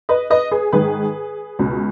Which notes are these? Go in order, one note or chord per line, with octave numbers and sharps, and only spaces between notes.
B4 D#5
B4 D#5
G#4 B4
G#2 D#3 G#4 B4
C#2 B2